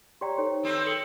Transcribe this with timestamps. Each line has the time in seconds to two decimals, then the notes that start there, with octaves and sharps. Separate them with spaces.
0.21 G4 C#5 D5 G5 A#5 C6
0.38 D#4 A4 C5 C#5
0.63 D#3 C4 B4
0.86 A4 C#7 F#7 G7